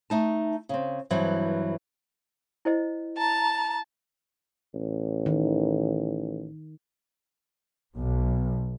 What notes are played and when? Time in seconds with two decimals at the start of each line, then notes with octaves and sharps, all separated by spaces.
0.10 A3 D#4 A5
0.69 C#3 C4
1.10 G2 E3 F#3 C4
2.65 E4 C5 D#5
3.18 A5 A#5
4.74 A1
5.26 D#3
7.96 B1